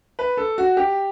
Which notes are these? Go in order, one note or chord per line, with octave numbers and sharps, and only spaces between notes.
B4
A4
F#4
G4